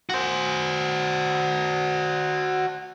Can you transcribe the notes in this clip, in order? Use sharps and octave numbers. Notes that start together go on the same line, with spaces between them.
F#4 C5